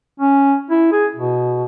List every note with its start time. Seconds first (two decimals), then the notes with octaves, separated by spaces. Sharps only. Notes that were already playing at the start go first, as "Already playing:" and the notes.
0.20 C#4
0.70 E4
0.92 G#4
1.15 B2